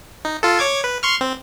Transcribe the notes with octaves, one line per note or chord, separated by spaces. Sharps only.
D#4
F4 A4
C#5 D6 G#6
B4
C6 C#6 F6
C4